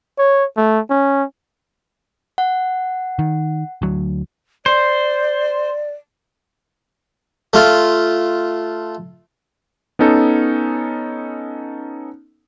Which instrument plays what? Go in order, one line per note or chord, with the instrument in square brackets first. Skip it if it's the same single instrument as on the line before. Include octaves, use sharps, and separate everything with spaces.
[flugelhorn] C#5
A3
C#4
[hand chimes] F#5
[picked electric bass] D#3
D2 F#3
[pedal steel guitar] C5 [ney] D5
[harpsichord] A3 F4
[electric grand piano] B3 C#4 D#4 A4